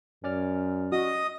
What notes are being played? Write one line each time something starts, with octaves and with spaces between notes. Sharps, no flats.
F#2 C#4 D5 F6
F#4 D#5 D#6